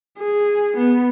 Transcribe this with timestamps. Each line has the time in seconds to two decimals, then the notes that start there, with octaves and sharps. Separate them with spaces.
0.18 G#4
0.77 B3